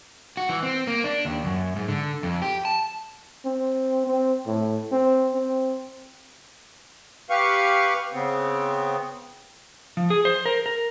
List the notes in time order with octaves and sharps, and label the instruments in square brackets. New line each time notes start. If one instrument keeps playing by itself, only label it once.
[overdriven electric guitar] F#4
E3
C4
A#3
D4
D#2
F#2
G#2
D3
F2
G4
A5
[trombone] C4
C4
A2
C4
C4
[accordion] G4 B4 F5 C#6
C#3 B3 C4
[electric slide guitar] F3
G#4
C5
A#4
A#4